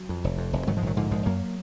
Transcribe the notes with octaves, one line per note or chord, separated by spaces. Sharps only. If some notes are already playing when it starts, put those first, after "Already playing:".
Already playing: F#3
F2
F1
F2
F1
G#2 D#3 F#3
F3 G#3
A#1 D#3 F#3
G#2 D3 F3
A#1 F3 G#3
F#2 F#3 A#3